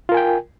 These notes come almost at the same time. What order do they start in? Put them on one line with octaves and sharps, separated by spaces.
F4 A#4 G#5 G5